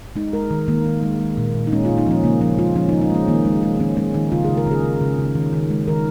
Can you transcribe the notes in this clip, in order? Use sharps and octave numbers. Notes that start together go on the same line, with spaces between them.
G#3 D#4
G#3 A#4
D#3
D#3 A#3
D#3
G#3
G#3
A#2
A#2
D#4
G#3 C#4
A#2 F4
D#4
F3 C#4
C#3 A#3
F3 C#4
G#3 F4
F3 C#4
D#4
F3
D#4
G#3 C#4
D#3 A#3
G#3
G#3
D#3 C#4
G#3 C#4
D#3 D#4
C#3 F4
C#3 G#4
A#4
C#3 G#4
C#3
C#3
C#3
D#3
D#3
G#3
D#3 A#4